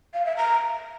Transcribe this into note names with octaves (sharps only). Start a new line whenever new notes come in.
F5
E5
A#5